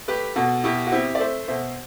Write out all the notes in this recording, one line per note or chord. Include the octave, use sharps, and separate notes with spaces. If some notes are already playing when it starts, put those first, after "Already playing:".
A3 G4 B4
B2 F#4 A4
B2 E4 G4
F#4
C4 E4 G4
D5
A3 C5 E5
B2 C5 E5